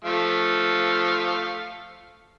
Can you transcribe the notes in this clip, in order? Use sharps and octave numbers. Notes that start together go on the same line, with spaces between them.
F3 A3 F5